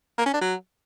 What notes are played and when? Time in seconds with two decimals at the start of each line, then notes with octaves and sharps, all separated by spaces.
0.18 A#3
0.26 C#4
0.33 D4
0.41 F#3